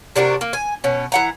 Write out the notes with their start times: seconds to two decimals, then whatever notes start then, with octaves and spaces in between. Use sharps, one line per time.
0.16 C3 D4 F#4 A#4
0.41 A#3
0.53 G#5
0.84 B2 C#4
1.12 E3 F#5 A#5